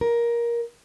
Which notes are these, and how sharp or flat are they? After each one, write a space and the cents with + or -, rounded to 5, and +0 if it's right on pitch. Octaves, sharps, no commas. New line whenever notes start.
A#4 +15